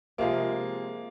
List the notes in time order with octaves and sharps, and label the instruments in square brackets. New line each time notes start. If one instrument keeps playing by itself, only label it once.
[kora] C3 F3 G#3 [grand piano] A#3